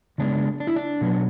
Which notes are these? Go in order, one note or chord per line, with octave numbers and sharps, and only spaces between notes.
C#3 G#3 B3 D4
D4
E4
D4
B2 F#3 B3